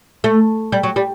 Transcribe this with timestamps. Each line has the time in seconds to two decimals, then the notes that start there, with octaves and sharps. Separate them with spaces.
0.24 A3
0.72 G3
0.83 F#3
0.96 G3